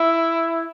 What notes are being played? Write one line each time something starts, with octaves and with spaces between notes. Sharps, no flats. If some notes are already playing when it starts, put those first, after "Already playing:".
Already playing: E4